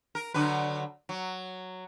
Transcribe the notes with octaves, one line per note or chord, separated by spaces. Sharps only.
A#4
D3 F#3 B4
F#3